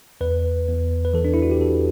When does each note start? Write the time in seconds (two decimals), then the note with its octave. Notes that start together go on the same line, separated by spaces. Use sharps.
0.21 E2 B4
0.68 E2
1.05 B4
1.14 E3 A4
1.25 D4
1.34 E4
1.42 F#4
1.51 G4
1.60 E2 A4